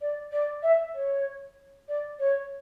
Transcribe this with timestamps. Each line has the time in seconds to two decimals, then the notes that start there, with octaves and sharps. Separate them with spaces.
0.01 D5
0.31 D5
0.62 E5
0.94 C#5
1.88 D5
2.19 C#5